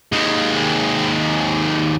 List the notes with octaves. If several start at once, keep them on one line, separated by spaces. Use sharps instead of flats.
D#2 G#3